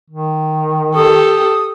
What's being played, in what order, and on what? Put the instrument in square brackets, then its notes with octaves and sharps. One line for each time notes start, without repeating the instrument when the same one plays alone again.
[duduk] D#3
[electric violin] G4 A4 [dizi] D#6